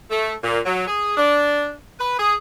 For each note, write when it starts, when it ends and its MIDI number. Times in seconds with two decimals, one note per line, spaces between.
0.11 0.33 57
0.43 0.59 46
0.66 0.86 54
0.87 1.16 68
1.17 1.73 62
1.99 2.15 71
2.18 2.33 68